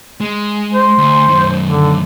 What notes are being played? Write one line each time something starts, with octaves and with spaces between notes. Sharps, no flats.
G#3
C5
D2
F#2 D#3
D3